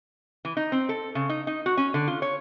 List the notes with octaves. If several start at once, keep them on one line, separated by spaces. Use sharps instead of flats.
E3
D#4
C4
A4
C#3
D#4
D#4
F#4
C#4
D3
F4
C#5